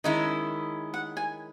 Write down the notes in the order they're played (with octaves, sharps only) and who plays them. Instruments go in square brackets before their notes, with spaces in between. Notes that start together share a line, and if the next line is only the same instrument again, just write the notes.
[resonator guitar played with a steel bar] D#3 G#3 C#4 E4 [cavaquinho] D#5
[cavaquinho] F#5
G#5